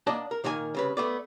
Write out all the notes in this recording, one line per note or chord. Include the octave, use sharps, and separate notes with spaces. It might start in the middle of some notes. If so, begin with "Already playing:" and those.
A#3 D4 D5 D#5 F#5 A5
A#4
A#2 D#3 A#3 A#4 G#5
C2 C#3 B4
A3 B3 D5